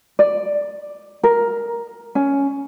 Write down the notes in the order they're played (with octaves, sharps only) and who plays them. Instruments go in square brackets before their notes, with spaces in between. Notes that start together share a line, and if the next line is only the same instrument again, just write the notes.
[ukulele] D5
A#4
C#4